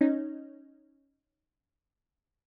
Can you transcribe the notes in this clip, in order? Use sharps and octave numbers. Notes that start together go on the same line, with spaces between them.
C#4 D#4